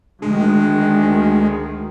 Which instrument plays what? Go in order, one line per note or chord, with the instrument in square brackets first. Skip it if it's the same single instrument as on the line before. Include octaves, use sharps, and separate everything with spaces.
[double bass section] D2 D#3 [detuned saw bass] G#3 [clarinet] D4